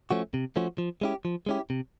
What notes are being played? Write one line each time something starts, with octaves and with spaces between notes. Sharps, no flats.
F3 A3 C#4 F#4
C3
F3 A3 C#4 F#4
F3
G#3 C#4 E4 G4
F3
G#3 C#4 E4 G4
C3